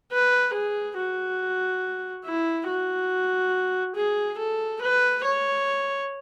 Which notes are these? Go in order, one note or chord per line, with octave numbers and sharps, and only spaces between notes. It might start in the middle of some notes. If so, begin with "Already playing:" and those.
B4
G#4
F#4
E4
F#4
G#4
A4
B4
C#5